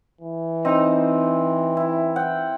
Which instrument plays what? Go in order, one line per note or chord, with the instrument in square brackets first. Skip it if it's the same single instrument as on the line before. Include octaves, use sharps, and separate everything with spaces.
[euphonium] E3
[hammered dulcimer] C4 [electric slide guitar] D#4 D#5
[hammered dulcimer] E4
F#5 G5